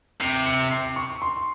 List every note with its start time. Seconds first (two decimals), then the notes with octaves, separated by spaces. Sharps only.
0.21 C3 C7
0.46 C#7
0.71 C7
0.96 C#6
1.22 C6